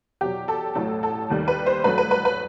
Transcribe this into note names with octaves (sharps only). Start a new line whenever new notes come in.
E2 B2 F#3 G4
A4
A1 A2 F#3 A3 A4
A4
D#2 D#3 G3
B4
C5
A1 G2 F#3 A3 B4
B4
B4
B4